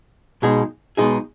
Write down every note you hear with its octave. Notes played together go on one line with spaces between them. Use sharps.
B1 B2 G#3 D#4 G#4
B1 B2 G#3 D#4 G#4